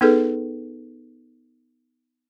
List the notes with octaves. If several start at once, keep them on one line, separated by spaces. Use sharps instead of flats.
B3 D#4 G#4 A4 B4